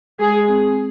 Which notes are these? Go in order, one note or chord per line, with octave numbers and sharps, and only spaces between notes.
G#3 G#4
C4